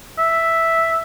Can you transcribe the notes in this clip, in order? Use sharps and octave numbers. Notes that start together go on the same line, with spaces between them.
E5